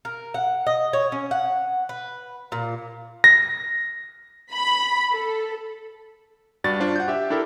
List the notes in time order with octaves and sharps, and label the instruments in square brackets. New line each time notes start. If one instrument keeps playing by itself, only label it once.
[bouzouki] A#4
F#5
D#5
C#5
C#4
F#5
B4
A#2
[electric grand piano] A#6
[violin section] B5
A4
[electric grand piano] G2 F#4 D5 A6
D4 F4 C5
F#5 G6
G4 E5
D4 E4 G4 A4 A#4